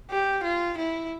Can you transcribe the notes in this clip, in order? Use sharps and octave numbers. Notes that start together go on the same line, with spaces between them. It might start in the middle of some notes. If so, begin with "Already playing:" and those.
G4
F4
E4